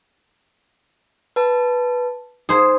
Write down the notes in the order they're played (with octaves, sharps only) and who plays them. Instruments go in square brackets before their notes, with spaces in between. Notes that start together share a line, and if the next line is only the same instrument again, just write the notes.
[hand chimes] B4 A5
[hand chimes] D#4 [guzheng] G#4 C5